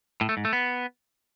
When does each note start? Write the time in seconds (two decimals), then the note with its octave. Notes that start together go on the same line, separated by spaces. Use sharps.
0.21 A2
0.29 A3
0.37 G#2
0.45 A3
0.53 B3